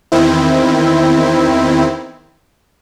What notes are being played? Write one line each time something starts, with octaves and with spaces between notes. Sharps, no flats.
E2 D#3 C4 E4